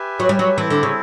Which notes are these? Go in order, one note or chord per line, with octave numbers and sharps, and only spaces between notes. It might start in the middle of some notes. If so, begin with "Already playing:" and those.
Already playing: G4 B4 E5 G#5
F#3
G3
F#3
E3 C4 E4 A4
D3
C#3